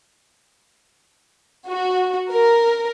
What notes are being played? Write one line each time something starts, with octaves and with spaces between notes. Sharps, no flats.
F#4
A#4